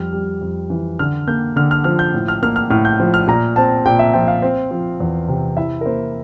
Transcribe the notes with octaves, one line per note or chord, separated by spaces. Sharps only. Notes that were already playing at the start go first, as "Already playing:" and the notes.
Already playing: F2 G3 F6
G3
F2
E3
D3 F6
A#3 G6
D3 F6
F6
F3 F6
G6
A2
F6
A#3 F6
F6
A2 F6
G6
F3
F6
A#2 A#5
C4 A5
A#2 G5
E5
F3 G5
F5
C4
F3
E2
C3
E4 E5
A#4
A#3 C5